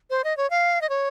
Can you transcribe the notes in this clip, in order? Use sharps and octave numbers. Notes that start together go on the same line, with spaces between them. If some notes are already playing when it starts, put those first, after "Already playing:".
C5
D#5
C#5
F5
D#5
C#5